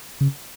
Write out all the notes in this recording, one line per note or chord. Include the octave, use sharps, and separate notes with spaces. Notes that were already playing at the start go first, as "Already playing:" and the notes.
C#3